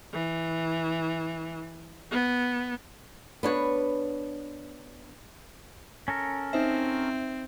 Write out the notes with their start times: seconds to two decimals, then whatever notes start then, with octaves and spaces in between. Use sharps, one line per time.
0.13 E3
2.11 B3
3.43 B3 D4 C#5
6.08 C#4 A4 A#4
6.53 C4 D#4 C5 E5